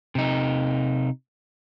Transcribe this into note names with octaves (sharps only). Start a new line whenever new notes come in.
C3 D#4